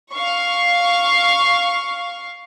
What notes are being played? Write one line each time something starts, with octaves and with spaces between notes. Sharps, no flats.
F5 C#6